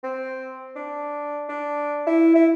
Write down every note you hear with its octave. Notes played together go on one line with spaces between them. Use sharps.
C4
D4
D4
E4
E4